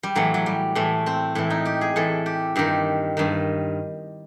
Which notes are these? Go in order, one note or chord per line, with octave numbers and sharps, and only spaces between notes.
G3
A2 E3 F#3
F#3
G3
A2 E3 A3
C4
A2 E3 E4
D#4
G4
G#4
A2 E3 A4
G4
G2 D#3 G4
G2 D#3